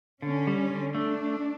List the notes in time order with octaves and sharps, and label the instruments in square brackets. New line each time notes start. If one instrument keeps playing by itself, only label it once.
[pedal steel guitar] D3 [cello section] C#4
[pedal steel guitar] G3
D3
[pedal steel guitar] A3 [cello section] D4